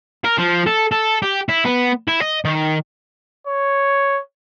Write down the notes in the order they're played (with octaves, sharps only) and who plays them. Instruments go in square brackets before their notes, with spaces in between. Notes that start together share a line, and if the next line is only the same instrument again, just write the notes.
[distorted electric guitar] A#4
F3
A4
A4
G4
E4
B3
E4
D#5
D#3
[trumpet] C#5